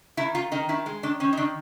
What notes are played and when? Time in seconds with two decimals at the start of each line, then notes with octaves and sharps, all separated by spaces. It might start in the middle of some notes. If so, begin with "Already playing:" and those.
0.17 D#3 E4
0.35 D#3 F4
0.52 D#3 D#4
0.69 D#3 E4
0.86 G#3
1.03 D#3 D4
1.20 C4 C#4
1.33 D#4
1.37 D#3 D4